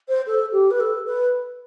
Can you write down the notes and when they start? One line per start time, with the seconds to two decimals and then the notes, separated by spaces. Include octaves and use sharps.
0.08 C5
0.26 A4
0.52 G4
0.70 B4
0.80 A4
1.06 B4